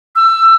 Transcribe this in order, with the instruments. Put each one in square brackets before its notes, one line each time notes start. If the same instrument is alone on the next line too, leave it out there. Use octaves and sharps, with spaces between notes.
[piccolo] E6